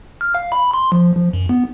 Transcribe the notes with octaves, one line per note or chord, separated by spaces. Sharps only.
F6
F5
B5
C6
F3
F3
F#2
B3